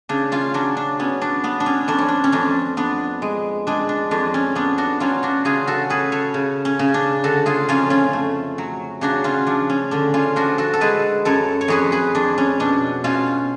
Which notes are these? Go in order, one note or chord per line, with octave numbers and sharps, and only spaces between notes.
C#3 D4
C#4 F4
F#3 D4
D4
B3 C#4
D4
B3 D4
D4
C#4
F2 D4
C#4
D4
C#4
F2 D4
B3 D4
G#3
G#3 D4
D4
F2 D4
C#4
B3 D4
D4 F#4
F#3 C#4 F4
D4 F#4
C#3 F4 G#4
F#4 A4
C#4 G#4 B4
A4 C#5
C#3
C#4
C#3
D4
D3 F#4 A4
F4 G#4
F2 C#4 F4
C#4 F4
A3
F#3
C#3 D4 F#4
C#4 F4
F3 D4
C#4
D3 D4
C#4 F4
F3 D4 F#4
F#4 A4
A4
G#3 G#4 B4
F#2 A4 C#5
C#5
F2 G#4 B4
G#4 B4
F2 D4
C#4
B2 D4
B2 C#4 F4